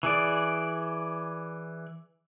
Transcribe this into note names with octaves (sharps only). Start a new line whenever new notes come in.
E3 G#4 D5